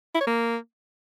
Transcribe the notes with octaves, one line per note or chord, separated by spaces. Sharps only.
E4
C#5
A#3